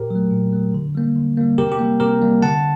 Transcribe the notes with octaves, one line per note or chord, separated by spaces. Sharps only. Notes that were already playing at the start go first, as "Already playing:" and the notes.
Already playing: A#2 G4 A#4
F#3 A3
A#2
F#3 A3
D3
G3 A#3
D3
G3 A#3
C3 G4 A#4
G4
G3 A#3
C3 G4 A#4
G3 A#3
D3 F#5 A5